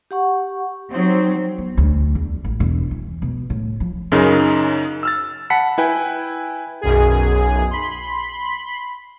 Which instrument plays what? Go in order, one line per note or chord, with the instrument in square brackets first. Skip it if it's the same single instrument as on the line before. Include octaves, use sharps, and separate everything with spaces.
[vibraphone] G4 F#5 C#6
[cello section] F#3 C4 [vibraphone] D#4 C5
[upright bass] B3
D2
E2
A1
E1
E3
B2
A2
F3
[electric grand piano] F#2 C#3 D#4 A#4
E6 F6 A6
F#5 A5 B5 B6 C#7
E4 B4 G5 G#5
[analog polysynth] B1 F#2 G#4
B5 C6